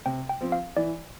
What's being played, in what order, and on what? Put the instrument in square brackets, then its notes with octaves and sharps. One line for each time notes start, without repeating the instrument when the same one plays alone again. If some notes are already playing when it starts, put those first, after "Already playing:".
[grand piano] C3 [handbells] G5
[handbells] G5
[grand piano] F3 C4
[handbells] F5
[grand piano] E3 [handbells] D5